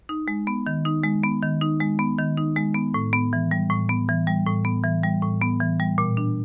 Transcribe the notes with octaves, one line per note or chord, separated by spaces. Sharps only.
D#4
G#3
B3
D#3
D#4
G#3
B3
D#3
D#4
G#3
B3
D#3
D#4
G#3
B3
A2
B3
E3
G3
A2
B3
E3
G3
A2
B3
E3
G3
A2
B3
E3
G3
A#2
D4